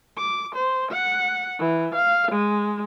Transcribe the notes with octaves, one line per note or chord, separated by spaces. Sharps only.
D6
C5
F#5
E3
F5
G#3